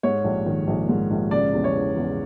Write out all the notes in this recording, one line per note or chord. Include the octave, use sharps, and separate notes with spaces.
G#2 C#5
A#1
D#3
A#1
G#2
A#1
C#3 D5
E2
C#5
E3
E2